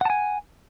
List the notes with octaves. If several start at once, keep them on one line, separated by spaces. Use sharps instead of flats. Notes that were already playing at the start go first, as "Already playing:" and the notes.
F#5 G#5 A5